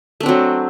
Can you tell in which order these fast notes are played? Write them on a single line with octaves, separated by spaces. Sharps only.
A3 D4 C4 F#3